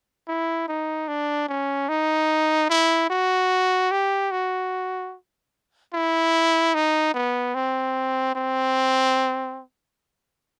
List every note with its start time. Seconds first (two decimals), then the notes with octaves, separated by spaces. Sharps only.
0.28 E4
0.68 D#4
1.08 D4
1.49 C#4
1.89 D#4
2.70 E4
3.10 F#4
3.91 G4
4.31 F#4
5.93 E4
6.75 D#4
7.14 B3
7.55 C4
8.35 C4